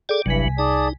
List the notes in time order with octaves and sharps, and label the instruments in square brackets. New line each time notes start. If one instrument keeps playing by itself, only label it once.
[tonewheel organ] G#4 A4 D5 [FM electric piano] G5 D6
[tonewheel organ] G1 F#3 [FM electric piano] C2 G#5 B6 [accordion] G2 E3
[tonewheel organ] D#4 [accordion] G#4 D5 A5